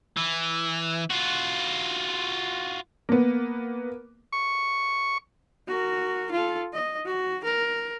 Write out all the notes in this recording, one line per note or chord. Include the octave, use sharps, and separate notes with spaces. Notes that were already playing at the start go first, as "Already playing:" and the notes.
E3
F4 F#4
A#3 B3
C#6
F#4 A#4
F4 A4
D#5
F#4
A#4